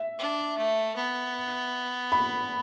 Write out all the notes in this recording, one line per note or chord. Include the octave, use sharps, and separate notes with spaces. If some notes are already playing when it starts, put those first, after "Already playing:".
Already playing: E5
D4
A3
B3
B5